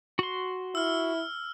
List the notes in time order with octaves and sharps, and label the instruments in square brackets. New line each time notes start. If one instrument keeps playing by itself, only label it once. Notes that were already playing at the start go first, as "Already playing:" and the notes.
[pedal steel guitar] F#4 C6
[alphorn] E4 [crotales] E6 F6